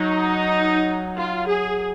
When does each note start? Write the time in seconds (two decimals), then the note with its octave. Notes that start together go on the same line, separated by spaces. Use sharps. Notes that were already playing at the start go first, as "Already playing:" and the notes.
Already playing: F#3 D#4
1.15 F4
1.47 G#4